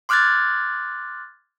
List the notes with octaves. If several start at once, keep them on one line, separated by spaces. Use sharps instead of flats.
C6 D6 F6 F#6 G#6 A6